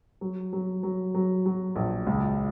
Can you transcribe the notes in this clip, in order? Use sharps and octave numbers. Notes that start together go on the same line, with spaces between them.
F#3
F#3
F#3
F#3
F#3
A#1
C#2